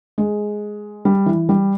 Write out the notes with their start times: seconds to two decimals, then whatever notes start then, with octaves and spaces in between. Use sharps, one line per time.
0.18 G#3
1.05 G3
1.26 E3
1.49 G3